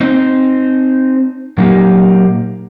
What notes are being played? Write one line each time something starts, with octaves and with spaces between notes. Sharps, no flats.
C4 D#4
A#2 F#3 A#3 D#4 G4